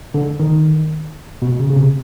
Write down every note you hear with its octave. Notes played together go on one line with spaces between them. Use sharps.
D3
D#3
B2
C#3
C#3
C3